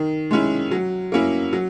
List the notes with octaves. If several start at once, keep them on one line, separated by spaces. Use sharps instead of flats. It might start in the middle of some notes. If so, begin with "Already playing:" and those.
Already playing: D#3
G#3 C#4 E4
F#3
A#3 C#4 E4
F#3